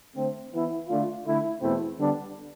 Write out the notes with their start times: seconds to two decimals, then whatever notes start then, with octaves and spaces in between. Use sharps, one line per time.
0.15 D3 A3 C4
0.52 E3 B3 E4
0.88 D3 A3 D4 F4
1.25 D3 A3 E4
1.62 E2 B2 A3 C4 E4
1.98 D3 G3 B3 D4